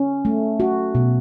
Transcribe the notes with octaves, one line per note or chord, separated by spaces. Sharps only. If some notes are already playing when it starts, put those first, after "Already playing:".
Already playing: C#4
A3
F#4
B2